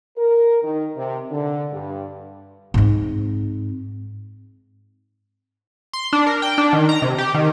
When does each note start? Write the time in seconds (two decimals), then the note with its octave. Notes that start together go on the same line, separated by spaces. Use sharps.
0.18 A#4
0.62 D#3
0.97 C3
1.31 D3
1.73 G2
2.74 G#2 C4
5.93 C6
6.13 D4
6.27 A#4
6.42 G5
6.58 D4
6.73 D#3
6.89 A#5
7.02 C3
7.18 G4
7.34 D#3